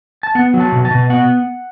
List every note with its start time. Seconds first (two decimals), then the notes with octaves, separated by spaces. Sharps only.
0.23 A5
0.35 B3 F#5
0.54 F#3
0.60 A5
0.72 B2
0.85 A5
0.91 B2
1.10 B3 F#5